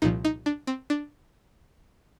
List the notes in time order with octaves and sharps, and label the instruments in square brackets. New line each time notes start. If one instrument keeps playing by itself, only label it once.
[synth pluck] C2 A#2 F3 D#4
D#4
D4
C4
D4